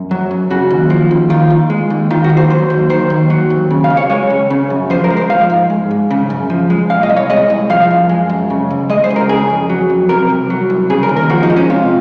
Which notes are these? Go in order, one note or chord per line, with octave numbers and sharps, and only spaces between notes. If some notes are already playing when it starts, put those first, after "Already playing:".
Already playing: F#2
F#3
F#2
C#3 F#4
D#2
F3
D#2
D#3 F4
D#2
G#3
D#2
D#3 F4
F#4
D#2
C5
F#3 C5
D#2
D#3 C5
D#2
F#3
D#2
C#3
F5
C#2
C#5
G#3 C#5
C#2
C#3
F#2
F3 C5
A#4
G#3
C5
F3 F5
G#2
G#3
G#2
C#3
F#2
F3
G#3
A#2 F5
D#5
C2
C#5
G#3 D#5
C2
F3 F5
F#2
G#3
F#2
C#3
C#2
G#3 D#5
C5
C#2
A#4
C#3 G#4
F2
F#3
F2
C3 A#4
C2
F#3
C2
C#3 G#4
A#4
D#2
A#4
F3 F#4
D#4
G#3
C#4
C3 F4